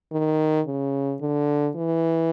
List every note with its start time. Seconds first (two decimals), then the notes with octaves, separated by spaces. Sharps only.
0.12 D#3
0.67 C#3
1.21 D3
1.76 E3